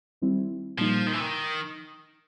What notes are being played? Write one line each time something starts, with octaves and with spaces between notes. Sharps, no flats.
D#3 G3 C4 E4
A#2 F3 G3 A#3 D#4
D#3
E3
D#3